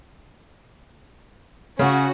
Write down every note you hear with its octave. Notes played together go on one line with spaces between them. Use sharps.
C#3 C#4 F#4